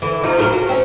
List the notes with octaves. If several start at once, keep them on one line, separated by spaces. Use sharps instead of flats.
D3 E3
C3 F3 D#4
A2 F#3 A#4
F#4
C4 C#4